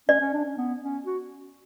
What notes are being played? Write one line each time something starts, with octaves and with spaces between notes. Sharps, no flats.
C#4 D5
C#4
D4
C#4
B3
C#4
F#4